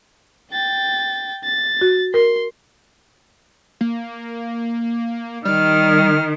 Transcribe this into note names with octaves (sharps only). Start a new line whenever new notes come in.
G5 A6
A6
F#4
A#4 C6
A#3
D#3 G3 F6